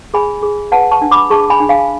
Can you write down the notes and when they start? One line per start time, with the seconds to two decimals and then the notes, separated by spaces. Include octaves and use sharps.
0.14 G#4 G#5 B5
0.43 G#4
0.72 B4 F#5 A5
0.91 A5 C#6
1.02 D4
1.11 B5 D6
1.30 G#4 A5 C#6
1.50 G#5 B5
1.60 D4
1.69 F5 G#5